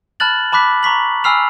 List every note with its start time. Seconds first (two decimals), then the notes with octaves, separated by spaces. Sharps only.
0.20 A5 B5 F6 F#6 A6 F#7
0.52 A5 B5 D6 F#6 B6
0.83 A#5 C#6 B6 F#7
1.24 G#5 B5 E6 F6 C7 F7